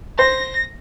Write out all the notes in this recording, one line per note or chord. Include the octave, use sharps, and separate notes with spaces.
C5 A#6